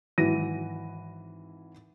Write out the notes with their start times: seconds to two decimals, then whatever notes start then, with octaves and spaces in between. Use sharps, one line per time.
0.18 G#1 E3 F#3 E4 A#6 D#7